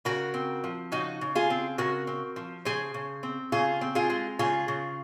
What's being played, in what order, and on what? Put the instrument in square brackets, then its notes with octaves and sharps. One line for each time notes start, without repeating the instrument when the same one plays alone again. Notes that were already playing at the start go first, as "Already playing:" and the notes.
[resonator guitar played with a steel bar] C#3 F#4 A#4
C4
F3
C#3 D#4 F#4
C#3
F4 G#4
C4
C#3 F#4 A#4
C4
F3
C#3 G#4 C5
C#3
C4
C#3 F4 G#4
C4
F4 G#4
G#3
C#3 F4 G#4
C#3